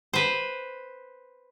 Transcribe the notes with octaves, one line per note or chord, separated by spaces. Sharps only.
B4 C5